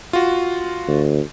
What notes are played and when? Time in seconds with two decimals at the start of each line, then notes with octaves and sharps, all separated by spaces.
0.13 F4 F#4
0.88 D2